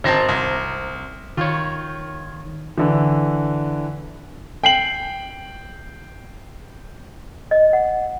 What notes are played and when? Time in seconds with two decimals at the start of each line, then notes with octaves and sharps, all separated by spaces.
0.04 G#1 C4 C5 A5 A#5
0.29 C2
1.37 D#3 F4 C#5
2.78 D3 E3
4.64 G5 C7 F#7
7.51 D#5
7.73 F#5